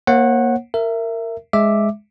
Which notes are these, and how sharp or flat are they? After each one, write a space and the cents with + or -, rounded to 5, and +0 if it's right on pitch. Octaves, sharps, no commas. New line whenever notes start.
A#3 +15 C#5 -40 F#5 +0
A#4 -20 E5 +15
G#3 +0 E5 +0 D6 +0